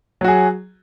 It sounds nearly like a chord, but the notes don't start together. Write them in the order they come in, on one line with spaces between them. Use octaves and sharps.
F#3 F#4 G#4